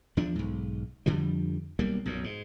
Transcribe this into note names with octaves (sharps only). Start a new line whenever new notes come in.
E2 F3 D4
B1 G#2
F2 D3 F3 G3
B1 G3 A#3
B1 F#2 A#2
G#2